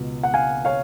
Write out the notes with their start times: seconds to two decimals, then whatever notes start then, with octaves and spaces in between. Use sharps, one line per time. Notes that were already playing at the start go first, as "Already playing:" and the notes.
Already playing: C#2 B2
0.23 F#5
0.34 F5 G#5
0.65 C#5 F5